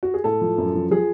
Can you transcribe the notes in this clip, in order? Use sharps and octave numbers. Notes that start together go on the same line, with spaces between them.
F#4
G#4
A2 A4
F3
F#2
F3
F3 G#4